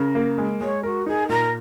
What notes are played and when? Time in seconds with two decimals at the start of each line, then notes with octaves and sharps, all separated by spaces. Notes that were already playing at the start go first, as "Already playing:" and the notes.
Already playing: C#3 A#4
0.15 A#3
0.38 G#3
0.61 G#3 C#5
0.83 F#4 A#4
1.06 D#4 G#4
1.29 A#2 A#4